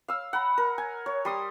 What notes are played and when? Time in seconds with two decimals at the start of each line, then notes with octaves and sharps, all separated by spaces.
0.08 F5 E6
0.33 F#5 A#5 B5
0.58 A#4
0.78 G#5
1.06 C#5
1.25 G3 C6 D#6